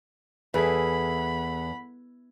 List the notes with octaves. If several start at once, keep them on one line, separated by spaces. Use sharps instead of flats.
E2 G#4 A4 B4 F#5 B5